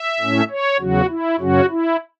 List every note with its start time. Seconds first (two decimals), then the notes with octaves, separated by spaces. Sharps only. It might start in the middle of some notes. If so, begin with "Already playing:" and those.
Already playing: E5
0.20 A2 A3 C#4
0.50 C#5
0.80 E2 C#3 F#3 F#4
1.09 E4
1.39 F#2 C#3 F#3 C#4 F#4
1.70 E4